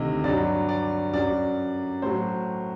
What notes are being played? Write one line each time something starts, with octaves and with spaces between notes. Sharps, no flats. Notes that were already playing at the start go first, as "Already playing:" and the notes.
Already playing: D2 C3 D#3 D#5
G2 F#3 D5
D5
F#2 F#3 D5
A2 F#3 C5